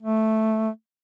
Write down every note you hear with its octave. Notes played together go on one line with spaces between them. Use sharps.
A3